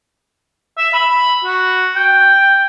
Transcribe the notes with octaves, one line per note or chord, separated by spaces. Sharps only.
E5
B5
F#4
G5